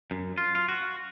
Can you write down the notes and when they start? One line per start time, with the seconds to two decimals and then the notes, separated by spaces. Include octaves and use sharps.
0.11 F#2
0.38 F4
0.55 F4
0.69 F#4